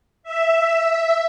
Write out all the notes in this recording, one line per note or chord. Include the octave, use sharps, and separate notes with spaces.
E5